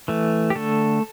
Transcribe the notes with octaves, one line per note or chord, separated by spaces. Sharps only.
E3 A3
G4
D3 A3 A4